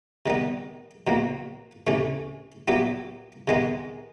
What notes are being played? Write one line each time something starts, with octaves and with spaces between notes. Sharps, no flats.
C3 D#3 G3 B3
E2 B2 F#3 A#3
D2 C3 E3 A3 C#4
A#2 F#3 B3 E4 G4
C3 D#3 G#3 B3